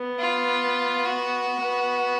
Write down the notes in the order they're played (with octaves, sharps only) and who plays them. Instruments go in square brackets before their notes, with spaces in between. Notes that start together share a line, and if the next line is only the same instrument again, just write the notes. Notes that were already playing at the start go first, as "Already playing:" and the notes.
Already playing: [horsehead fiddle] B3
[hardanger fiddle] F4
F#4
[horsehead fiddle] B3